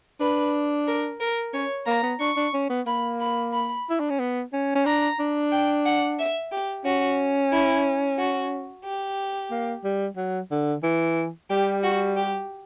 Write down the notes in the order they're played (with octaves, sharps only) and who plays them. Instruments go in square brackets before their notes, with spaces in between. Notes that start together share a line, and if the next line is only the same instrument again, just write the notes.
[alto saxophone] D4 [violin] B4
[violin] A#4
A#4
[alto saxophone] C#4 [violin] C#5
[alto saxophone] A#3 [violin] A#5
[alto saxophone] B3
[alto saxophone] D4 [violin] C#6
[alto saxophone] D4
C#4
B3
[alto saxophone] A#3 [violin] B5
[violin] B5
B5
[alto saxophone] E4
D4
C#4
B3
C#4
C#4
[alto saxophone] D4 [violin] A#5
[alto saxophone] D4
[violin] G5
F#5
E5
G4
[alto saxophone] C#4 [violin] F#4
[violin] E4
F#4
G4
[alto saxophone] A#3
G3
F#3
D3
E3
[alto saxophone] G3 [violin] G4
[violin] F#4
G4